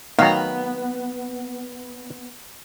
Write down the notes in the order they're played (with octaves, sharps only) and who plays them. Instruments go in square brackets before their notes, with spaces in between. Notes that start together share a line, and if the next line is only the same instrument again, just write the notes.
[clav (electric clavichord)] D#3 F#3 [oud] B3 [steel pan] F5 A#5